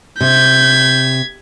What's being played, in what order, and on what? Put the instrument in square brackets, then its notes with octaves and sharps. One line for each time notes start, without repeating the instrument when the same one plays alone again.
[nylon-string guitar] C3 [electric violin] G6 [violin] G#6 B6